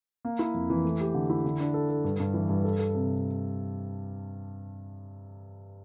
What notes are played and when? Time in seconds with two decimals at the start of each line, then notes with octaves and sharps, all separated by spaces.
0.25 A#3
0.39 E4
0.54 F2
0.70 E3
0.84 A3
1.00 G4
1.14 D3
1.30 E4
1.45 D3
1.60 D4
1.74 A4
1.89 A4
2.04 G2
2.20 G2
2.34 E3
2.49 G2
2.64 A4
2.79 A4
2.94 C3